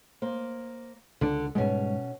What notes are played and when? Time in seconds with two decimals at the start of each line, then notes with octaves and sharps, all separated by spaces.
0.22 A#3 C5
1.21 C#2 D3 D4
1.55 G#2 B2 G3 G#3 C#4